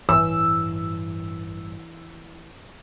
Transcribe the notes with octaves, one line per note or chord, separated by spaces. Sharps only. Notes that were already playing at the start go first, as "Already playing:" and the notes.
A1 G2 E3 E6